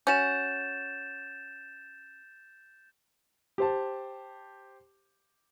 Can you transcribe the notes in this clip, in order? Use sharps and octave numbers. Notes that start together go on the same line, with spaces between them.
C#4 F#4 G6 A6 E7
G4 C5 A5